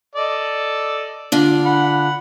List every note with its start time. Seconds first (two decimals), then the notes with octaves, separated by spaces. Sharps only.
0.15 A4 D5 D#5
1.32 D3 D4 F4
1.65 F#5 B5